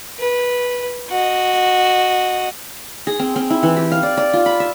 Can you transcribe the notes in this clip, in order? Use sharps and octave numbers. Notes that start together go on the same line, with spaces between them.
B4
F#4 D#5
G#4
C4
C4
E4
E3
G4
F5
D5
D5
F4
B5
E5